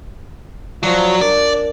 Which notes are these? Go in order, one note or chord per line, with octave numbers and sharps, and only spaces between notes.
F3 F#3 F#4 D5 C#6
D4 A#4 D5